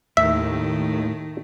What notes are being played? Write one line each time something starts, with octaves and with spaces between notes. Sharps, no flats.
D#2 A2 D#3 A3 E5